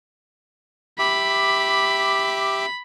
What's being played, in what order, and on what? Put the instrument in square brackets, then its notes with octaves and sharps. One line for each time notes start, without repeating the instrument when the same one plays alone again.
[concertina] G4 E5 D6 [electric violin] B5